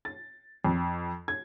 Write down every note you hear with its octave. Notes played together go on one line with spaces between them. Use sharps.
A6
F2
G#6